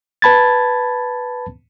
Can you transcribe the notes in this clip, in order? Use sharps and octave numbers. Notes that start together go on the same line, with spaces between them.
B4 A5 B5 G#6 A6